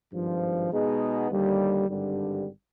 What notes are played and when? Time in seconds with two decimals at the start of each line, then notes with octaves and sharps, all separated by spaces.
0.13 G#1 G2 F3
0.71 B2 G#3 B3 D#4 G#4
1.29 D#2 D3 G3
1.89 G#1 G2 D3 G3